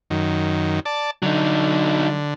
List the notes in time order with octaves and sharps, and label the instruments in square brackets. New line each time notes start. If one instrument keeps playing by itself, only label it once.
[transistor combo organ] F#2 D#3
D5 A5
[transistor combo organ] D3 [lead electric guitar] F#3 D#4